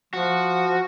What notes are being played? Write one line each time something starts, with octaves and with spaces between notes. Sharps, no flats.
F3 F#4